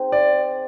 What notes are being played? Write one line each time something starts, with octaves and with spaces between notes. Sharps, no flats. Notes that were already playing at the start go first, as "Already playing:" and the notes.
Already playing: C4 D#4 G#4 C5
D5